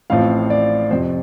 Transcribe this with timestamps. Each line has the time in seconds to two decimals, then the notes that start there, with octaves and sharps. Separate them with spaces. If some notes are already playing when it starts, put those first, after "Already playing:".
0.10 A1 A2 F3 C4 F5
0.50 D5
0.90 F2 C3 F3 C5